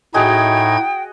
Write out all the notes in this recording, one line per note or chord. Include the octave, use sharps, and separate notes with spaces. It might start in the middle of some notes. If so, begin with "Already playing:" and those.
A2 D#4 F#4 G#4 D#5 G5 G#6